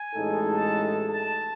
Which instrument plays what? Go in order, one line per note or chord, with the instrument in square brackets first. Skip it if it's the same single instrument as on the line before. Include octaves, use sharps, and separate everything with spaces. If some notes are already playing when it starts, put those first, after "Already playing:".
Already playing: [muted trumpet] G#5
[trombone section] A1 A2 G#3 D#4 A4
[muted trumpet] A5
A5